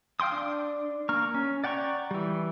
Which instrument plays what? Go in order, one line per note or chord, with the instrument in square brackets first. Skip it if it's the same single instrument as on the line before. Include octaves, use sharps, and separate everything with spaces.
[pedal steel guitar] F5 G5 C6 D#6
D4
A#3 A#5 C#6 F6
C#4
D5 F#5 G5 A#5 C#6
E3 G3